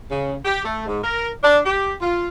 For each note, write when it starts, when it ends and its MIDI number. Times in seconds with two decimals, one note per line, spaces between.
0.11 0.34 49
0.45 0.65 67
0.65 0.86 57
0.86 0.99 44
1.03 1.29 70
1.43 1.59 62
1.66 1.93 67
2.01 2.28 65